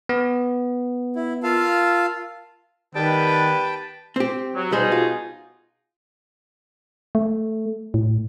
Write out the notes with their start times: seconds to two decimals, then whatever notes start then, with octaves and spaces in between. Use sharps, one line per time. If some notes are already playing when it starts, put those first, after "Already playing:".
0.09 B3
1.16 E4
1.43 F4 A#4 F5 A5 E6
2.95 D#3 G3 B3 B4 G5 A5
4.16 C4 G4
4.55 F#3
4.72 B2 G3 D#4 G#4 C5
4.92 F4
7.15 A3
7.94 A2